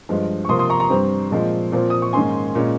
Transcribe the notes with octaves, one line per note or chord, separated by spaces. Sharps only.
G2 F3 G#3
C#6
C3 F3 A#3 C6 D#6
C6 D#6
A#5 C#6
A#5 C#6
G2 G3 C4
A#2 F3 G#3 C4
A#2 F3 C4
D#6
C#6
G#2 D#3 A#3 C#4 G#5 C6
A#2 G#3 C#4